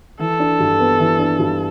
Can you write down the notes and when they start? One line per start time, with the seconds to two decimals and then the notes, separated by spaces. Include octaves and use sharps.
0.19 E3 A4
0.40 D4
0.60 G2
0.80 B3
0.99 E3
1.19 D4
1.39 G2